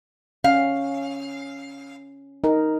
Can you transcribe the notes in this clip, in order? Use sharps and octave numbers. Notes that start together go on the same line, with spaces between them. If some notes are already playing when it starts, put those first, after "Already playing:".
C#4 F5
D#4 A#4